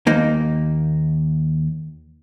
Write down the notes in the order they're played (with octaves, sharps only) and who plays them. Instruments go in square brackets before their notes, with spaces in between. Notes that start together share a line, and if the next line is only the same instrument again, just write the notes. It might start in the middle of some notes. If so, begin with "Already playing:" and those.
[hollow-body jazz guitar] D#2 A#3 D#4